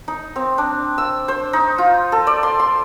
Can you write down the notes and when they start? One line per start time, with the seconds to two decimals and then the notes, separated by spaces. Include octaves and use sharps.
0.08 D#4
0.36 C4
0.58 D4
0.98 E6
1.28 C5
1.53 D#4
1.78 F4
2.12 A4
2.27 D5
2.43 C6
2.60 C6